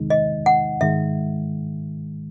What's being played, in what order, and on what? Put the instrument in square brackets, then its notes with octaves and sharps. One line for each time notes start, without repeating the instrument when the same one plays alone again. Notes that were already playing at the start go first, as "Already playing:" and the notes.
Already playing: [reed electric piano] E2 C3 D#3 G#3 D#4
[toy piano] D#5
F#5
[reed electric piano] G#2 D#3 G#3 [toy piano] E5